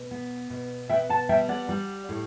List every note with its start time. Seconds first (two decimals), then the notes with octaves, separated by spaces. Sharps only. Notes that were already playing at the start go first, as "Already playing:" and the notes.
Already playing: B2
0.11 B3
0.50 B2
0.89 B3 E5 G5
1.09 F#5 A5
1.29 G3 E5 G5
1.49 D5 F#5
1.69 G3
2.09 A2